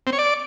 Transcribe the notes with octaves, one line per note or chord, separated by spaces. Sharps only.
C4
C#5
D5